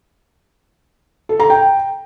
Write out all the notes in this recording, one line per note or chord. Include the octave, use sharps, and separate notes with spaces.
A4
A#5
G5